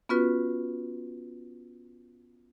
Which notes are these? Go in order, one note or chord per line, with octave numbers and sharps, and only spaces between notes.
B3 C#4 F4 F#4 B4